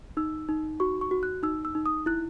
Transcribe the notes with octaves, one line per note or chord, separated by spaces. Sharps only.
D#4 E6
D#4
F#4 C#6
C#6
F#4
F#6
D#4 E6
E6
D#4
D#6
E4 F#6